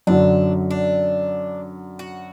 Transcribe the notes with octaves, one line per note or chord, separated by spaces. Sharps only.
F#2 D3 F#3 D4
D4
F#4